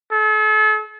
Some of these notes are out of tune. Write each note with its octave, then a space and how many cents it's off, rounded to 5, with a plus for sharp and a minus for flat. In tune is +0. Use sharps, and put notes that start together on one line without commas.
A4 -40